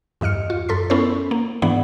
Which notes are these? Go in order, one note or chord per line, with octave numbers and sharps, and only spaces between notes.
E2 G2 D#5 F6 C#7
F4
F#2 A4 C6 B6
B3 C#4 E4 A4 A#4 C5
A#3
G#2 E3 B3 D4 D5 F#5